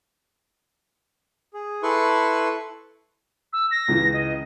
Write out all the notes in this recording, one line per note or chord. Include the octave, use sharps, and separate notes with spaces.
G#4
E4 A4 B4 C6 C#6
E6
A#6
C#2 C#3 E3
D#5